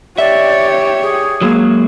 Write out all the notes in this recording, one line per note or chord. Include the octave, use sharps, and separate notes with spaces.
G4 C#5 D5 E5
G#4
F#3 G#3 A#3